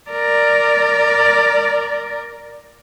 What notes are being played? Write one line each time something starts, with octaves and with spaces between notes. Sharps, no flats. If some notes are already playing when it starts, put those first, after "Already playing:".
A#4 D5